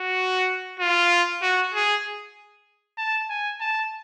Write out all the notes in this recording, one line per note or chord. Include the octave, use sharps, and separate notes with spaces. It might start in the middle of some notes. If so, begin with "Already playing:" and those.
Already playing: F#4
F4
F#4
G#4
A5
G#5
A5